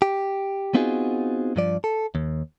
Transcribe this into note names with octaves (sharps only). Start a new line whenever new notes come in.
G4
B3 C4 D#4 F4 F#4 G#4
G2 F3 D5
A4
D#2